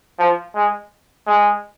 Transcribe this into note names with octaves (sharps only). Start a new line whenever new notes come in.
F3
G#3
G#3